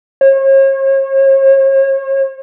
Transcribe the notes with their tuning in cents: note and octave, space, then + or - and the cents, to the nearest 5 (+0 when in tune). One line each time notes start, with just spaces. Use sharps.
C#5 -40